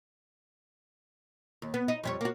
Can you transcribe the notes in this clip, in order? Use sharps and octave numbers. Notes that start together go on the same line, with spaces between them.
D#2
B3
D#4
F2 G3 C#5
A#3 F#4